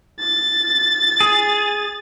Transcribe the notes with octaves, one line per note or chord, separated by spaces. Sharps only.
A6
G#4